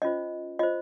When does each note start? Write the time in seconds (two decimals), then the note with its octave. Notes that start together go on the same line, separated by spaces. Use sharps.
0.02 C#4 F4 C5 D#5
0.59 F4 C5 D#5